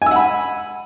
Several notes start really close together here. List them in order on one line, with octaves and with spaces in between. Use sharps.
G#5 E6 F#5 B5